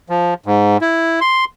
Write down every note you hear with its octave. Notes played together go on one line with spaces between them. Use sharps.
F3
G#2
E4
C6